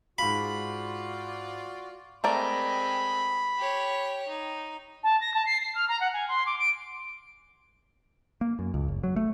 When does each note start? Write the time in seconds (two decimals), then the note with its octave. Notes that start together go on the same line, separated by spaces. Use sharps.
0.18 G#2 F4 F#4 D5 F5 B5
2.24 G#3 A3 C4 A#4 D5 B5
3.57 G4 C#5
4.29 D#4
5.03 A5
5.21 A#6
5.34 A5
5.46 C7
5.61 C7
5.75 F6
5.88 A#5
6.00 F#5
6.13 G#5
6.28 C6
6.46 D6
6.58 D7
8.41 A#3
8.59 F#2
8.74 C#2
8.88 F#1
9.03 F#3
9.16 A3